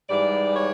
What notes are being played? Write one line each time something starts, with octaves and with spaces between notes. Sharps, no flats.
G#2 E3 G3 D5
C#5